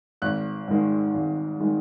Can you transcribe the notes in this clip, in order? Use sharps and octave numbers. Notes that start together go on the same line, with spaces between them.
G#1 F#6
G#2 D#3 G#3
G#1
D#3 G#3